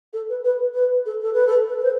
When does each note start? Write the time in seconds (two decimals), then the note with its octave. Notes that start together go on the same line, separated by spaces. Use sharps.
0.13 A4
0.29 B4
0.44 B4
0.74 B4
1.05 A4
1.21 A4
1.33 B4
1.47 A4
1.68 B4
1.79 B4
1.83 C5